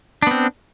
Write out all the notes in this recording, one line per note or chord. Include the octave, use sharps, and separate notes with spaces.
B3 C4 D4